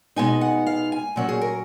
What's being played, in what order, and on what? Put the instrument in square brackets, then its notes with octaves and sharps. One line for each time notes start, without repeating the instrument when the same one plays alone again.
[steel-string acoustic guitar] B2 G#3 B3 D#4 G#5
F#5
F5
G#5
A#2 F#3 C#4 F#5
G#4
A#4